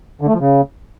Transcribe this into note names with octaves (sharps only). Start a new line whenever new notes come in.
D3
A3
F3
C#3